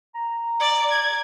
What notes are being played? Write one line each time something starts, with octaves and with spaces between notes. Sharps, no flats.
A#5
D5
G#6